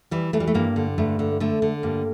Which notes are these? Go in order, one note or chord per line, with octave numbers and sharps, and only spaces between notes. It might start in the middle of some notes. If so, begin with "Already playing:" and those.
E3 G3
E3 A3
G3
A3
G2 A#3
D3
G2 A3
D3
D3 A3
D3
G2 A#3